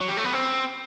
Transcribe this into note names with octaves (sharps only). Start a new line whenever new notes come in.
F#3
G3
A3
B3
C4